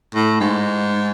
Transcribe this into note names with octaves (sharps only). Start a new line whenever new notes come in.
A2
G#2